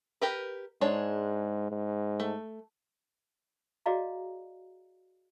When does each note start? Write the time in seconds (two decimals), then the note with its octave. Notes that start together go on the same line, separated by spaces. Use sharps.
0.21 G4 A#4 B4
0.81 G#2 G#3 D4 C#5
1.71 G#2
2.20 A3
3.86 F#4 G#4 D5 D#5 F5 A#5